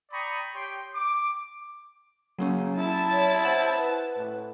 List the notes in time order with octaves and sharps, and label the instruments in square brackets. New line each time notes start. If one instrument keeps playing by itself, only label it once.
[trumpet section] D5 G5 A#5 B5 C#6 D#6
G4 C#5 G5 C6
D6
[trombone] C#3 [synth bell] F#3 A#3 C#4
[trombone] E4 [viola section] A5
[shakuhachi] C#5
[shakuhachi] C5 [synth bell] F#5
[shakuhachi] B4
[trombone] A2